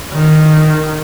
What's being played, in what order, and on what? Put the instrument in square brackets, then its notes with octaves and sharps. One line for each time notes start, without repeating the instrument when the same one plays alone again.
[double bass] D#3